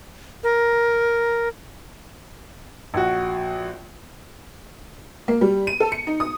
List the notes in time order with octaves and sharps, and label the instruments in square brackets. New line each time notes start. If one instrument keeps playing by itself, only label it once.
[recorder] A#4
[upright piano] A#1 F#4
[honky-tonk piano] A#3
G3
D#7
A4
C#7
D#4
D#6